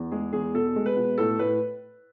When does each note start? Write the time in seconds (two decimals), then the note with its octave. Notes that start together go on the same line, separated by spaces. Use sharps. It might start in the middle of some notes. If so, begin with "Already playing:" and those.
Already playing: E2
0.11 G#3 G#4
0.33 E2 G#4
0.54 B2 A4
0.76 G#3
0.86 B4
0.96 B2
1.18 A2 A4
1.39 A2 B4